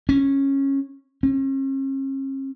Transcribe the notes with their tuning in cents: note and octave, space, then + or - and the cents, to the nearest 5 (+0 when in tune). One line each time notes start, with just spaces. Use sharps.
C#4 -15
C#4 -45